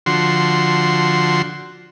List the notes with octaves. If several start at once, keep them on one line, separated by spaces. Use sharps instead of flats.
D3 F3 F#4 C6